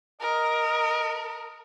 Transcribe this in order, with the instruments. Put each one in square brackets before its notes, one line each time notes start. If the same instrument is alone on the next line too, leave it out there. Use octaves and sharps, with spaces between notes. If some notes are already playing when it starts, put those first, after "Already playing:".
[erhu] A#4 [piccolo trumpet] D#5